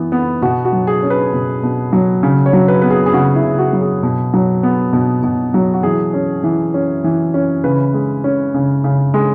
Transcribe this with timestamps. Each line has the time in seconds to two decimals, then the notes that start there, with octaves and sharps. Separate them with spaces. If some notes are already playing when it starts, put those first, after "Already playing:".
Already playing: E3 B3
0.12 B3
0.42 B2 F#4
0.65 F#4
0.73 F#3
0.87 G#4
1.03 C#4
1.10 B4
1.33 B2
1.63 B2
1.93 F#3
2.23 C#3
2.46 C#5
2.53 F#3
2.68 B4
2.82 B3 B4
2.90 G#4
3.06 G#4
3.13 C#3 F#4
3.35 E4
3.43 C#3
3.59 F#4
3.73 F#3
3.81 G#4
4.03 B2
4.34 F#3
4.63 B3
4.93 B2
5.23 B2
5.54 F#3
5.74 F#4
5.83 E3 G#4
6.14 C#4
6.44 E3
6.74 C#4
7.04 E3
7.34 C#4
7.64 C#3 B4
7.94 G#3
8.24 C#4
8.54 C#3
8.84 C#3
9.14 G#3